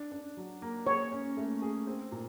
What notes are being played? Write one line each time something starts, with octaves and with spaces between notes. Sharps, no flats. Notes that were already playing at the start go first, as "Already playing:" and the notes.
Already playing: D4
D4
F#3
A#3
G#4 C#5
C#4
A3
G#4
C4
A#2